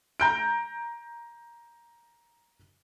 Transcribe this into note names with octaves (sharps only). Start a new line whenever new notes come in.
A#5 G6 D7